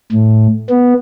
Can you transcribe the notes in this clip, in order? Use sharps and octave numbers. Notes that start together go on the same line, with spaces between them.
A2
B3